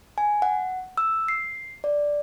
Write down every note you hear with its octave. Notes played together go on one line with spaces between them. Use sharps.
G#5
F#5
E6
C7
D5